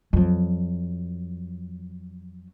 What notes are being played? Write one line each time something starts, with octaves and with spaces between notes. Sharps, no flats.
F2 F#3